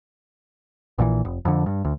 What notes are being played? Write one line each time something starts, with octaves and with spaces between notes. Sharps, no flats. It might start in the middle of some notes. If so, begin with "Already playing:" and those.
A#1 A#2 D3 E3
F1
F2 D3
G2
D2